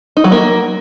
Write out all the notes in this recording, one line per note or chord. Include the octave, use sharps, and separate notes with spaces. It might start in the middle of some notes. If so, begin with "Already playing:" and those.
D#4
F#3
A#3